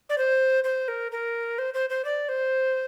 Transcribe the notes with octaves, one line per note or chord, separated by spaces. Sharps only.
D5
C5
C5
A#4
A#4
C5
C5
C5
D5
C5